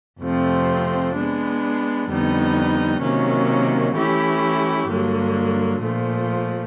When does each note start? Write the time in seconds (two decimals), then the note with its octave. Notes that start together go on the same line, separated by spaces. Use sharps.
0.22 F2 C3 F3 A3 C4
1.15 G#3 B3 D4
2.09 F2 D3 G3 B3 D#4
3.02 C3 D#3 F#3 A#3 C#4
3.95 E3 A3 C#4 E4 G4
4.89 G2 D3 F#3 A#3
5.82 A#2 F3 A3